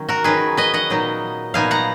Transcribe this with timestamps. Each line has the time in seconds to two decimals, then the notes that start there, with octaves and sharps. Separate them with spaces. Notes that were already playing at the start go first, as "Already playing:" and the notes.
Already playing: D#3 F#3 C#4
0.09 F#4 A#4
0.24 D#3 F#3 C#4 G#4 B4
0.57 B4 D#5
0.74 D#5 F#5
0.90 A#2 F#3 B3 D#4
1.54 A#2 F#3 B3 D#4 F5 G#5
1.71 F#5 A#5